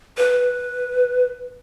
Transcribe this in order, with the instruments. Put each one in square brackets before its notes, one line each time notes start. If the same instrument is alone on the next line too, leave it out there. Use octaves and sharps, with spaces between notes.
[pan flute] B4